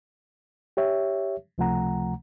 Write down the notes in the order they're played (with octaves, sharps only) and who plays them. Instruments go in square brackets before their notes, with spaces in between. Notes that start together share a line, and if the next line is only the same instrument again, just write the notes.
[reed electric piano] G4 C#5 E5
C#2 C3 F3 A3 F#5 A#5